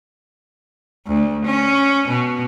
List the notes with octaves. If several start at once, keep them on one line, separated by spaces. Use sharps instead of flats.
D2
C#4
B2